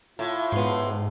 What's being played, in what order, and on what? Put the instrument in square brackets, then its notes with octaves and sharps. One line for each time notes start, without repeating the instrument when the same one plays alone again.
[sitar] A2 [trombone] F4
[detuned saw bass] G#2 [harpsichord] B2 C6